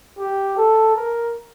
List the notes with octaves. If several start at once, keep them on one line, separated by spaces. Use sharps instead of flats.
G4
A4
A#4